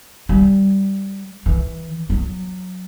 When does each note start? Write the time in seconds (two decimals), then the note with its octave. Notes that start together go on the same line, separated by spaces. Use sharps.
0.29 G3
1.46 E3
2.10 F#3